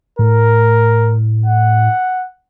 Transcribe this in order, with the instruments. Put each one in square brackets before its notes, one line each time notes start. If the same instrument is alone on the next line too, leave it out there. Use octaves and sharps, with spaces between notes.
[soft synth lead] A2 [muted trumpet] A#4
[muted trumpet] F#5